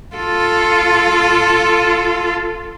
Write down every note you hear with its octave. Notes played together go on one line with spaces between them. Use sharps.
F4 A4